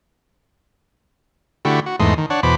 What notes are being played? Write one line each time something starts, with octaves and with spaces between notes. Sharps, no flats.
D3 A3 E4 F#4 G4
F#4
E2 G#2 A3 D#5 C6
D#3
D4 C#5 F#5
E2 B2 C5 B5 D6